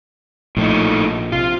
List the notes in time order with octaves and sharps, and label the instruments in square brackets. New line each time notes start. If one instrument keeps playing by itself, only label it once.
[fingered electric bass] A#1 [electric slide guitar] A2 A3 D#4
[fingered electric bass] C3 [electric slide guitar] F4